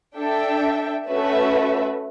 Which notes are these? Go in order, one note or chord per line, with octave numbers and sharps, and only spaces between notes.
D4 A4 E5 G5
A3 C#4 F#4 B4 E5